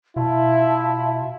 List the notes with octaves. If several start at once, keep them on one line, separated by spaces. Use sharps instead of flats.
B2 E4 F4 E5 A5